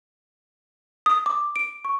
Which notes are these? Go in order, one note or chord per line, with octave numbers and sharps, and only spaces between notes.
D#6
D6
D7
C#6